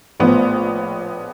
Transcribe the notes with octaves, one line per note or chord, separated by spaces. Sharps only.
A#1 A2 F3 B3